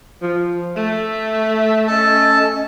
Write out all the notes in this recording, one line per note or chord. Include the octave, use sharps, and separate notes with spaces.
F3
A3 E5
C#4 A4 D#5 A5